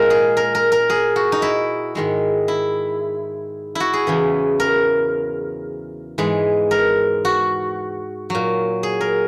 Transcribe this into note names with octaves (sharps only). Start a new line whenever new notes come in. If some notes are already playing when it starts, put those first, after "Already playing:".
Already playing: A#2 G#3 A#4
G#4
A#4
A#4
A#4
G#4
F#4
D#4
E4
G#2 D#3 G#3
E4
E4 F#4
G#4
E2 C#3 E3
A#4
G#2 E3 G#3
A#4
F#4
A#2 F#3
G#4
A#4